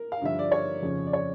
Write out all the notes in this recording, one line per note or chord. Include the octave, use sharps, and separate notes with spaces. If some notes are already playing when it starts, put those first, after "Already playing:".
Already playing: A#4
F5
G2 D3 F3 E5
D5
C#5
F2 C#3 F3 C#4
D5
C#5